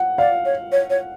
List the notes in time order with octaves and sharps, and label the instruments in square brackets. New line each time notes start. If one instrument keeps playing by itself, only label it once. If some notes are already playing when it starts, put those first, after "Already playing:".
Already playing: [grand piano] F#5
[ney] D5 [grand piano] F5
[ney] C#5
C#5
C#5